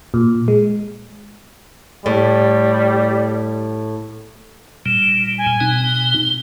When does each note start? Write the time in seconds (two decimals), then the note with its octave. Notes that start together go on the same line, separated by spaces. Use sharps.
0.14 A#2
0.48 G#3
2.06 A2 G3
4.86 A#2 G3 E7
5.38 G#5
5.60 B2 C4 D#4
5.83 G7